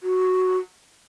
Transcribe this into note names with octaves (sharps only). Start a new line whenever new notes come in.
F#4